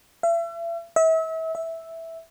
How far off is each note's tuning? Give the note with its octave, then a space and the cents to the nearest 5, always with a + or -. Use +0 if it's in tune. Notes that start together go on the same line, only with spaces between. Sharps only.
E5 +40
E5 -35
E5 -5